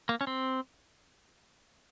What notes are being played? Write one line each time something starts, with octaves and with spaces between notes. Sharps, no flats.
A#3
C#4
C4